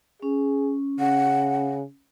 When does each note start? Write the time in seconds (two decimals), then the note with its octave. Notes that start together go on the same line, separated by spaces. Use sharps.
0.22 C#4 G#4
1.00 C#3 F#5